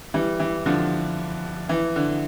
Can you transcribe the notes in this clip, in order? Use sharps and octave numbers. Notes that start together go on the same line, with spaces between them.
E3 G3
E3
D3 F3
E3
D3